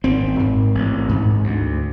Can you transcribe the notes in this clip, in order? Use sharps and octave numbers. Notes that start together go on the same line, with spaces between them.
G#1 C4
G#2
A1
G#2
D2